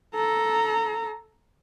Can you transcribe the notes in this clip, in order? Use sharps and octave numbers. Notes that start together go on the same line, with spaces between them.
A4 A#5